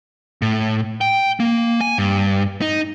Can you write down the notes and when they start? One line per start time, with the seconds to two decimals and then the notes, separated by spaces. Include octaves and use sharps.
0.42 A2
1.01 G5
1.40 A#3
1.81 G#5
1.98 G2
2.61 D#4